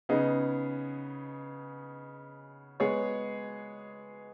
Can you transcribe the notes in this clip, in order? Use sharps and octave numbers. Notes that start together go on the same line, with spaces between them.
C#3 B3 D#4 G#4
G#3 B3 G#4 C#5